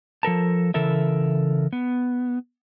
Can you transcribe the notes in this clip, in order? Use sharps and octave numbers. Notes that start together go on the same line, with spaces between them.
F3 A4 A#4 A5
C#3 E3 A4 A#4 E5
B3